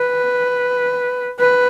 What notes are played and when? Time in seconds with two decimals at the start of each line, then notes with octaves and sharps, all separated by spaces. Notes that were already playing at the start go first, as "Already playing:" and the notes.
Already playing: B4
1.39 B4